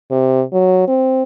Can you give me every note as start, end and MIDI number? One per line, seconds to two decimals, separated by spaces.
0.11 0.42 48
0.53 0.87 54
0.88 1.23 60